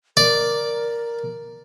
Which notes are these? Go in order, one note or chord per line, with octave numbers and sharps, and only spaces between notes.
A#4 D5